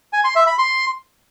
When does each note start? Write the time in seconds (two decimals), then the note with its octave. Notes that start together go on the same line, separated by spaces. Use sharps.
0.13 G#5
0.24 C6
0.35 E5
0.47 B5
0.58 C6